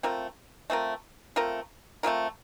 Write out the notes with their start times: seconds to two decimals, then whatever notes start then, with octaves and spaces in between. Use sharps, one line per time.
0.03 A3 C4 F4 A#4
0.70 A3 C4 F4 A#4
1.36 A3 C4 F4 A#4
2.03 A3 C4 F4 A#4